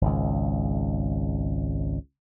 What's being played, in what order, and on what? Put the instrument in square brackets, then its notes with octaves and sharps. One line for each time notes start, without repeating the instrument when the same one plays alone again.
[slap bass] G#1 C#2